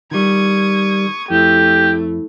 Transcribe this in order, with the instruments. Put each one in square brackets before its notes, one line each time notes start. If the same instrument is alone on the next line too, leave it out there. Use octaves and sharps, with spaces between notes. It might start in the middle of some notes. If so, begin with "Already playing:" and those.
[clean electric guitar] D#3 G3 [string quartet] C#6 D#6 G#6
[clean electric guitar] F2 [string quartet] A3 [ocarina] E4 [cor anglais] G4